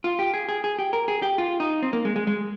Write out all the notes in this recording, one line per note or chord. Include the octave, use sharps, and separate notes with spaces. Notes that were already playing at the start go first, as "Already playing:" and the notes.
F4
G4
G#4
G#4
G#4
G4
A#4
G#4
G4
F4
D#4
C4
A#3
G#3
G#3
G#3